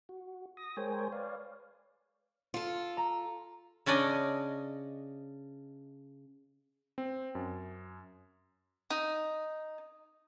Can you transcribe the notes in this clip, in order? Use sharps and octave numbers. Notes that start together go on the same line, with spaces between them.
F#4
D#6 A#6
G#3 A#4 C5 C#5 G5 G#5
B4 C#5 D5 F5
F4 A4
A#5
C#3 C#4 D4 D5 D#5
C4
F#2
D#4